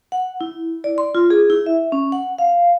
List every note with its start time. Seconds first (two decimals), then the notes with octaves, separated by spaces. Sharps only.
0.12 F#5
0.41 E4
0.84 D5
0.98 C6
1.15 F4
1.30 G#4
1.50 E4
1.66 E5
1.92 C#4
2.12 F#5
2.38 F5